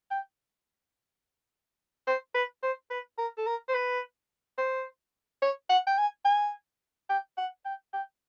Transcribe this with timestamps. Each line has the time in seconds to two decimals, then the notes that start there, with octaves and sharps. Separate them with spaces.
0.11 G5
2.07 C5
2.34 B4
2.63 C5
2.91 B4
3.18 A#4
3.37 A4
3.46 A#4
3.68 C5
3.74 B4
4.58 C5
5.42 C#5
5.69 F#5
5.87 G5
5.98 G#5
6.25 G#5
7.09 G5
7.37 F#5
7.65 G5
7.93 G5